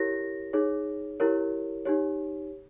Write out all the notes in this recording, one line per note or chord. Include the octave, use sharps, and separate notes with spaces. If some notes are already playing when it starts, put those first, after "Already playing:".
Already playing: E4 G4 A#4 C#5 A#6
D#4 G#4 C#5
E4 G4 A#4 C#5
D#4 G4 C#5